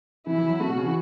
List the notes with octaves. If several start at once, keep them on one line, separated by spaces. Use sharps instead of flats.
E3 E4
E3
F#3
A3 F#4
B2
C#3
E3